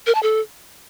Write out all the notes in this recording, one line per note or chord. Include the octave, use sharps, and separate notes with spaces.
A#4
A5
A4